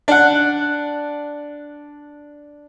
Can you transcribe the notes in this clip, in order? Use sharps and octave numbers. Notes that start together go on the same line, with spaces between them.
D4 F#5